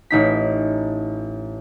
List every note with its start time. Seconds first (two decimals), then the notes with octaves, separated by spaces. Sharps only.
0.11 A1 D#4 B6